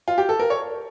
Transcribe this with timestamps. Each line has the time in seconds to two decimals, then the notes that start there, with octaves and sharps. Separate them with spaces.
0.08 F4
0.18 G4
0.29 A4
0.39 A#4
0.50 C#5